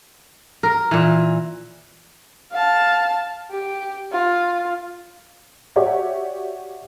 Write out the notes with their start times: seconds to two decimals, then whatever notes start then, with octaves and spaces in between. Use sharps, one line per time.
0.63 A#4
0.91 A#2 E3
2.51 F5 A5
3.50 G4
4.12 F4
5.76 F#4 G4 C#5 D5 E5 F#5